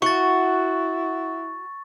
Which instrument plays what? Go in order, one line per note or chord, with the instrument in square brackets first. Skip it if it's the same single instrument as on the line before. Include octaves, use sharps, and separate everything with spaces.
[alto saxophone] E4 [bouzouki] F#4 [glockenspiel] C#6 A6